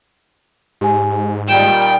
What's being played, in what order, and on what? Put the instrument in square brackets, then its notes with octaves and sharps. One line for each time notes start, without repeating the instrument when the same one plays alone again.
[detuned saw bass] G#2 [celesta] G4 G#5
[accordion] A#2 D#3 G3 [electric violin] G5 [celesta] E7